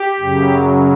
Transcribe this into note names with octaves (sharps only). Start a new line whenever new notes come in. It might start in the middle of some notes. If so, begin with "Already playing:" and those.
Already playing: G4
F#2 C#3 F#3